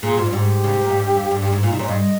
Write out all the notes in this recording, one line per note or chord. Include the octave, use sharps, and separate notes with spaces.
A#2 G#4
G#2 F4
G2
G#2 G4
C#3
C3
A#2
G#2
G2
F2
G2
G2
G#2
A#2 F4
C3 D#4
A#2 C#5
G2 D#5